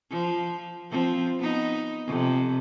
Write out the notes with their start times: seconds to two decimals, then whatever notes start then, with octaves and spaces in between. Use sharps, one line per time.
0.10 F3
0.91 F3 C4
1.39 B3 D#4
2.07 F2 C3